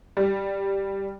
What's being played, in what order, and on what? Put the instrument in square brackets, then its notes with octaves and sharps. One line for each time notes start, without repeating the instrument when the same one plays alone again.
[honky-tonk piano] G3